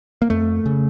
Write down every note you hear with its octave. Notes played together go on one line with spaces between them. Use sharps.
A#3
F2 A3
C#3